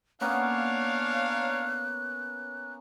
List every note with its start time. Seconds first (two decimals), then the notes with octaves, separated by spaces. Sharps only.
0.21 A#3 B3 C#4 D4 C#5 F5 F#6